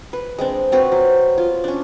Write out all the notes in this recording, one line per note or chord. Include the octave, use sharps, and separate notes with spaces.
B4
G#3 C4 D4
C4 F#4 B4 C#5
F#3
F4
C#4 D4